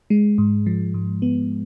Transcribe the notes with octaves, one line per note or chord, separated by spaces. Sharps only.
G#3
G#2
F3
G#2
B3